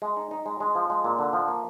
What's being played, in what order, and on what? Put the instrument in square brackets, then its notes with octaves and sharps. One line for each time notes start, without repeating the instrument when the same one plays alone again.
[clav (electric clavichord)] G#3
D#4
D#4
G#3
G#3
F3
G#3
A#2
D3
F3
A#3